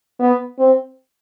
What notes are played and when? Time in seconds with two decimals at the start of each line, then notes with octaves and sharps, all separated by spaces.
0.19 B3
0.58 C4